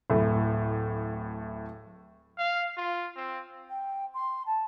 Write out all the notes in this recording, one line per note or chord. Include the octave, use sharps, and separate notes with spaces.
D1 A2 A3
F5
F4
C4
G5
C6
A5